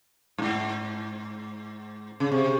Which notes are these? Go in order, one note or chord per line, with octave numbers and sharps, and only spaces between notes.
G2
G#2
C#3
C3